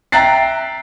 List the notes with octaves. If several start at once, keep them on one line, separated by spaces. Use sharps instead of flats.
E5 G5 A#5 F#6 A6 C7